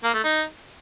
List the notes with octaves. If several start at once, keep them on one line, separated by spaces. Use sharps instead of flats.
A#3
A3
D#4